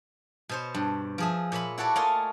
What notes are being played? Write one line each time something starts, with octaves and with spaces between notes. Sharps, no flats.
B2 C5 C#5
G2
F3 G#4 E5
A#2 C#5 E5 B5
E4 F#4 A4 C#5 D5
A3 A#3 F4 D#5 F5 G#5